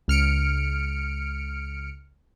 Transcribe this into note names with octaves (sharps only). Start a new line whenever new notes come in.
C#2 F6 C#7 D7